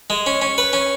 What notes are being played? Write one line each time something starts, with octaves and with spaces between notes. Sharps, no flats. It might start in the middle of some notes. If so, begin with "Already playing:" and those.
G#3
C#4
C#4
B4
C#4